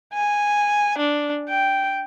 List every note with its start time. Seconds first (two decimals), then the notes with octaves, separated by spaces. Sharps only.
0.14 G#5
0.99 D4
1.49 G5